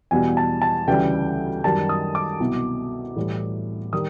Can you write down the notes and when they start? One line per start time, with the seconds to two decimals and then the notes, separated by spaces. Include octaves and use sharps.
0.11 E2 B2 G3 G#5
0.37 A5
0.62 A5
0.88 D2 C#3 E3 G3 G5
1.64 F#2 D#3 G3 A5
1.89 D#6
2.15 D6
2.40 C2 B2 F#3
3.16 A2 E3 G3
3.93 D#3 G3 D#6